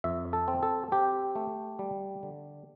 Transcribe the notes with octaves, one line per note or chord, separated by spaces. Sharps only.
F2 E5
A4
C4
A4
C4 G4
A3
G3
D3